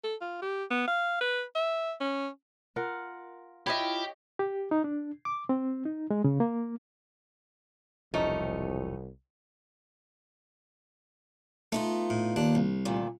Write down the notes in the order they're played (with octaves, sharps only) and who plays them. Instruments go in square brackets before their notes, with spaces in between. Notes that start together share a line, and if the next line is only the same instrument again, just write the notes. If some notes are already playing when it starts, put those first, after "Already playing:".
[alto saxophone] A4
F4
G4
B3
F5
B4
E5
C#4
[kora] F4 A#4 F#5
[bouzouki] E4 F4 E5 [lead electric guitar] G4 [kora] C#5 D#5
[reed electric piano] G4
D#4
D4
D6
C4
D#4
G#3
C#3
A#3
[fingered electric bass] E1 F3 [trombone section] C2 [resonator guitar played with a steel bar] A3 C#4 D#4 [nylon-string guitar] D#5 E5
[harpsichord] A3 [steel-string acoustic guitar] B3 D#4 F4
[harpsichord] A2
D#2 D4
C2
[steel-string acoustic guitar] D2 A#2 D#3